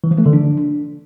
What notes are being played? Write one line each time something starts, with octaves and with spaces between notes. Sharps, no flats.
E3
F3
A3
D3
D4